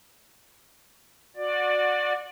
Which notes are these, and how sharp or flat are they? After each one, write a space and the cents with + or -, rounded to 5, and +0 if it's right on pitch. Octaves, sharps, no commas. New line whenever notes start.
F#4 -25 D5 +10